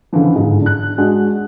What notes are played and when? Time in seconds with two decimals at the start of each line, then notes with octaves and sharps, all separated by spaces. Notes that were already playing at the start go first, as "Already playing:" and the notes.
0.13 C#2 D3 E3 F3
0.35 G1 G#2
0.62 D4 F#6
0.98 G#3 D4 F#4 F#5